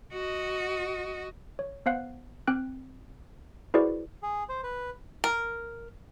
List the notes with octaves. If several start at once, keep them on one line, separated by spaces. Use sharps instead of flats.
F#4 D#5
C#5
B3 C5 F5 F#5 F#6
C4 G5 F#6
E4 F#4 G#4 B4 C5 D5
G#4
C5
B4
A#4